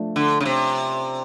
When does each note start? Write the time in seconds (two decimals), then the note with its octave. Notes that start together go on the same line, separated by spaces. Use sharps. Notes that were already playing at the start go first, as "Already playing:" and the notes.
Already playing: F3 A3 D4
0.16 D3
0.40 C#3
0.45 C3